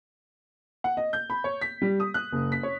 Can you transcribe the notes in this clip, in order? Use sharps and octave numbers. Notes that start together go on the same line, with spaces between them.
F#5
D#5
G6
B5
C#5
B6
G3
D#6
F#6
F#1
B6
C#5